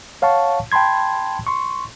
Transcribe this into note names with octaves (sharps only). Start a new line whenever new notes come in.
C#5 F5 F#5 A5 C#6
G5 A5 B5 C6 G#6
C6 C#6